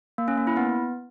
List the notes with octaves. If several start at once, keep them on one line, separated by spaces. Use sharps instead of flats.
A#3
C#4
A#3
E4
B3